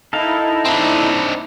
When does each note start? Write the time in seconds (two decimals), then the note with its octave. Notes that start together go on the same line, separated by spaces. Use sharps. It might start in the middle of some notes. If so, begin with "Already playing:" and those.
0.13 D#4 E4 A4 A#4 F5
0.65 C4 D4